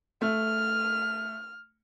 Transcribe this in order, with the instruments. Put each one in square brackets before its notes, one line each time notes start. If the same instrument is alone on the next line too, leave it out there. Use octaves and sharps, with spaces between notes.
[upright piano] A3 [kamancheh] F6